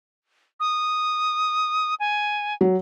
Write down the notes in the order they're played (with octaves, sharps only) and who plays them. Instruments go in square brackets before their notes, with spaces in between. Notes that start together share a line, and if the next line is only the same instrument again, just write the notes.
[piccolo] D#6
G#5
[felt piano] F#3